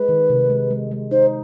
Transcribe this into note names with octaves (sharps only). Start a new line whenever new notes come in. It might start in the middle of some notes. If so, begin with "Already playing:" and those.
Already playing: G#3 B4
D#3
C3
G#3
G#3
G#3
D#4 C5